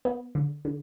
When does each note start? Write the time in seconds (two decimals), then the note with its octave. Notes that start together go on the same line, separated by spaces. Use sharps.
0.05 B3
0.35 D3
0.65 D3